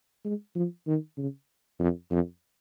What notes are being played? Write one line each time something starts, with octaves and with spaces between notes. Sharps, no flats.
G#3
F3
D#3
C#3
F2
F2